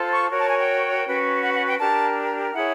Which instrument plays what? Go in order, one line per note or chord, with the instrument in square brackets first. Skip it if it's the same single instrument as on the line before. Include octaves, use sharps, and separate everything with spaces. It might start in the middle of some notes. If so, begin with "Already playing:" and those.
Already playing: [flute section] F4 A4 C5
C#6
F#4 A#4 C#5
A5
G#5
G5
C#4 F#4 B4
F#5
F#5
G5
D4 G4 A#4 A5
E4 G#4 C#5 F#5